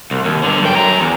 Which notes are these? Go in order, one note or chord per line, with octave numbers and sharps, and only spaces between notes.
C2
D#2
G2 D3
F#2 G5
F#2 A#5
E2